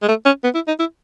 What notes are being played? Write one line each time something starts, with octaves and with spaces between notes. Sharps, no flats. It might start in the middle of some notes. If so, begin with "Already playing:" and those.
G#3
A3
C#4
B3
E4
D#4
E4